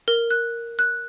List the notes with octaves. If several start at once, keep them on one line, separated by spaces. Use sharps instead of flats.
A#4
F#6
F#6